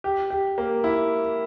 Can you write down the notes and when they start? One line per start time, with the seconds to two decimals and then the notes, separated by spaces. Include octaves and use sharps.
0.04 G4
0.30 G4
0.58 A#3
0.84 E4